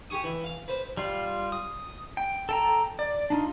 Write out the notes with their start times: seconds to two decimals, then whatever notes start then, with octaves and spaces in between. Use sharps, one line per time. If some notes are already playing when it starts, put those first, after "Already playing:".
0.10 G4 G#5 C#6 D#6
0.24 E3
0.44 F5
0.68 B4 C5
0.97 G3 F4
1.52 D#6
2.17 G5
2.49 A4 G5 A#5
2.99 D5
3.30 D4 D#4 F4